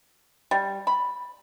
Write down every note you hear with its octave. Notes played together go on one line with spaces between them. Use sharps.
G3
B5